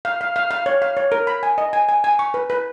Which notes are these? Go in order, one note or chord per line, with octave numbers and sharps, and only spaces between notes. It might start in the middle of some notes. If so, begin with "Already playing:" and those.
F5
F5
F5
F5
C#5
F5
C#5
A#4
B5
G#5
D#5
G#5
G#5
G#5
C#6
B4
B4